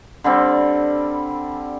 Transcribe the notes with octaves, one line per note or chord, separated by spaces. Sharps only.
D3 G3 C4